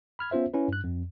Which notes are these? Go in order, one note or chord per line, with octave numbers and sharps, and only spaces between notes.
B5 F6 G#6
B3 C#4 F4 C5 E5
C#4 E4 B4
G2 F#6
F2